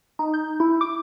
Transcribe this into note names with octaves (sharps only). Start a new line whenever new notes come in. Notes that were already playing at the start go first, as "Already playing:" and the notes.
D#4
G6
E4
D6